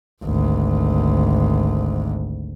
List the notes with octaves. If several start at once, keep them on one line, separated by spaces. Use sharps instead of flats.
G#1 D2